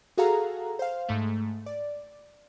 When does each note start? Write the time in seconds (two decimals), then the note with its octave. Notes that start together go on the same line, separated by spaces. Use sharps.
0.17 F#4 G#4 A4 F5 F#5 A#5
0.79 C5 F5
1.09 G#2 A3
1.66 D5